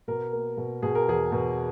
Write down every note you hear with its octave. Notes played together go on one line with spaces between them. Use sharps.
B2 A#4
A#3
B2
B2 G#4
A#4
E2 G#4
B2